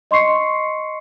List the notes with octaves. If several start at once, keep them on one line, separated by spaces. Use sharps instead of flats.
D#5 C6 C#6 C7 C#7